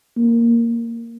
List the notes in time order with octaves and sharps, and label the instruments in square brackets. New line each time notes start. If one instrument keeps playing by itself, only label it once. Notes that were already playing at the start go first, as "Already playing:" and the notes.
[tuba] A#3